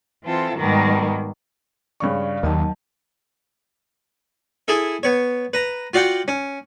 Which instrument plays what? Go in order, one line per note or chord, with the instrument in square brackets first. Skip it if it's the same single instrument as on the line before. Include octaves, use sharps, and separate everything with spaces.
[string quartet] E3 C4 F4 A4
G#2 B2 D#3 G3 A#3
[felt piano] G2 C#3 C#6 [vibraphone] D5 F5
[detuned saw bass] D#2 [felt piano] D#3 [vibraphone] F#3 D#5 A5
[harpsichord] E4 G#4 A4 E5
B3 C#5
B4 A#5
F4 F#4 D5 F#5 G5
C#4